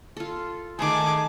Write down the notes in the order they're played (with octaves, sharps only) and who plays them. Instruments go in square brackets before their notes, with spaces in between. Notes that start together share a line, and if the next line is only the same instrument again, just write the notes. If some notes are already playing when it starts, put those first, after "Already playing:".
[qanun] F4 A4
[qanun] D#3 A3 [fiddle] G#4 D6 [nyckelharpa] G#5 A5